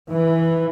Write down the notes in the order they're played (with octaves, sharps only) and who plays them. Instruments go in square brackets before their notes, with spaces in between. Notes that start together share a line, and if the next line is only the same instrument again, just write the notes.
[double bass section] E3